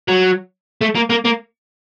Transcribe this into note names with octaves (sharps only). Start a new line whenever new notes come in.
F#3
A3
A#3
A#3
A#3